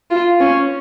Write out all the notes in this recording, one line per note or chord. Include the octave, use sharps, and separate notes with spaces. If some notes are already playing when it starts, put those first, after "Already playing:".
F4
C#4